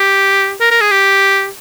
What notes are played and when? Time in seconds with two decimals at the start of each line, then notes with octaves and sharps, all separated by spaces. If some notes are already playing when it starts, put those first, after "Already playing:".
Already playing: G4
0.61 A#4
0.71 A#4
0.81 G#4
0.91 G4